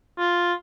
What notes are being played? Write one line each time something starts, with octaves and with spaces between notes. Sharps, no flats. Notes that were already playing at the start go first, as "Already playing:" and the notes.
F4